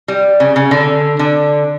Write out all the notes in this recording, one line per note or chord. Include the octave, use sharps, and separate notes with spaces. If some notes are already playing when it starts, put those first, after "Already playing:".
G3
C#3
C#3
D3
D3